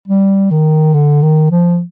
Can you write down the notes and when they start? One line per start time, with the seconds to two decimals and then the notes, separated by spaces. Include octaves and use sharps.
0.08 G3
0.51 D#3
0.94 D3
1.22 D#3
1.51 F3